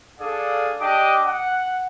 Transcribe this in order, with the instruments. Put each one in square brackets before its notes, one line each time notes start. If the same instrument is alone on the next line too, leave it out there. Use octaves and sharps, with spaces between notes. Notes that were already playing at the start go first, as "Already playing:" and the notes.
[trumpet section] D4 G#4 A4 D5 F5
D4 G4 D#5 D6 D#6
F#5